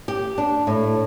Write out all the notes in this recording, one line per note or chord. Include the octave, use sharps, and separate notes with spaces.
G4
D4
A2